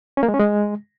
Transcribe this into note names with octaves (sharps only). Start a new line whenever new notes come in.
C#4
A#3
G#3
C#4
G#3